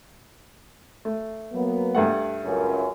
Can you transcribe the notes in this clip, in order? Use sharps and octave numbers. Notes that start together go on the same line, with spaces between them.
A3
F#3 A#3 B3
G2 A3 F#5
C#2 F#2